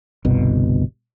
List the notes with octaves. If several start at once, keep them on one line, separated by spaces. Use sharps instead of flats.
G1 C2 B2